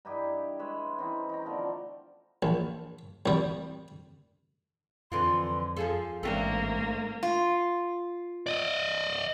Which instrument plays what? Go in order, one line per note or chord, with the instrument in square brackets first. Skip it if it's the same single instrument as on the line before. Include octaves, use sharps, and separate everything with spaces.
[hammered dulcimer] G2 D#4 E4 G4
G#3 B4 C#5 E5
E3 C4 C#4 D#4
D#4 G5 A#5
B2 D3 F3 A3
[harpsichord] A#1
C2 G3
[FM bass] F2 [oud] D3 E3 F4 [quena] C6
[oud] F3 G#4 A4 [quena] F5
[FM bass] A1 [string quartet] G#2 A#3 [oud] A3 C4 D4
[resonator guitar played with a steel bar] F4
[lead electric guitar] D5 D#5